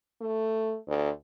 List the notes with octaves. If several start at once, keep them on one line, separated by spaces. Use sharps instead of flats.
A3
D2